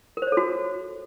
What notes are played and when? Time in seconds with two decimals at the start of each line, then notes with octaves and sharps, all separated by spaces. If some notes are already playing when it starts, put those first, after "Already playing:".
0.17 A#4
0.22 C5
0.27 C#5
0.32 A4
0.37 F#4